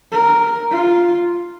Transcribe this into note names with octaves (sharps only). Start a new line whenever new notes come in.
A#4
F4